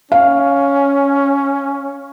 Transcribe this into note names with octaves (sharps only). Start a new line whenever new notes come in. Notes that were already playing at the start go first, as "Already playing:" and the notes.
C#4 F5